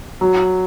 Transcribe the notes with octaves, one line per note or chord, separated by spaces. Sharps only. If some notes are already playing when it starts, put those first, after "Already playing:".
F#3